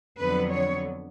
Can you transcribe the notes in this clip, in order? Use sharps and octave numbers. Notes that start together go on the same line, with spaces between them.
F2 D3 F#3 B3 B4
C#5